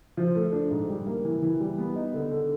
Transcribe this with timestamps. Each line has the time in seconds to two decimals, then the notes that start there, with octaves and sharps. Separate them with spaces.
0.17 F3
0.35 A3
0.52 D4
0.71 G#2
0.89 G3
1.07 A#3
1.24 E3
1.42 E3
1.60 G3
1.78 B3
1.96 D#4
2.14 D3
2.31 D3